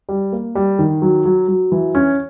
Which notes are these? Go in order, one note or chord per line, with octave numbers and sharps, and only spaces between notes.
G3
A#3
G3
D#3
F#3
F#3
F#3
E3
C#4